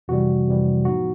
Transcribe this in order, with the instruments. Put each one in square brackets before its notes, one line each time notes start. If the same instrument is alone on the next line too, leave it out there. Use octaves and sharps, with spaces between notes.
[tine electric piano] F2 C3 E3 G3 F#4
F2 C3 E3 G3
A2 F3 G#3 B3 D#4 F#4